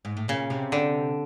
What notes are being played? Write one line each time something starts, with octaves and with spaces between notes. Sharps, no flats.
G#2
A2
A#2 C#3
C3
D3